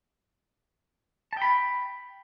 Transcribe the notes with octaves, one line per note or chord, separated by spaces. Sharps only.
G5 A5 B5